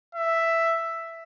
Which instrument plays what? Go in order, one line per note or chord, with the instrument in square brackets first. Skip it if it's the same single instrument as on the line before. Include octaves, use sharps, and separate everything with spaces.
[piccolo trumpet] E5